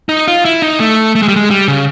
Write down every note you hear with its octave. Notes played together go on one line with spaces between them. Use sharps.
D#4
F4
E4
D#4
A3
A3
G#3
G3
G#3
G3
C#3